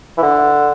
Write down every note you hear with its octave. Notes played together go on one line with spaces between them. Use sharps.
E3
D3